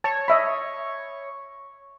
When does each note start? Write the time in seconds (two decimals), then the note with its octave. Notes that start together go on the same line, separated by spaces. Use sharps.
0.04 C#5 A5
0.28 D#5 E5 B5